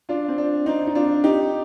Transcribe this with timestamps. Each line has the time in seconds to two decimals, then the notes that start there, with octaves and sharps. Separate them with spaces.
0.09 D4 F4
0.28 C4
0.38 D4
0.66 C4 D#4
0.87 D#4
0.95 D4 F4
1.24 D#4 G4